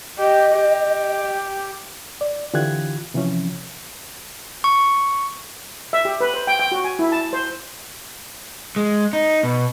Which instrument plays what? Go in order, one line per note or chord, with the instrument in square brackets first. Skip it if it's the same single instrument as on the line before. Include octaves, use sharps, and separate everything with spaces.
[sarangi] G4 [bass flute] D#5
[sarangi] G4
[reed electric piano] D5
D3 E3 F4 G4 F#6 G#6
C3 E3 F3 C#4
[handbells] C#6
[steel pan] E5
G4
B4
C5
G5
G5
F#4
G#5
E4
A5
C5
[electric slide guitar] G#3
D#4
B2